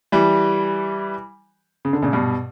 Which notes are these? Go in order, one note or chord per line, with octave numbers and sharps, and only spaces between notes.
E3 G3
C#3
D3
A#2 C#3
G2 B2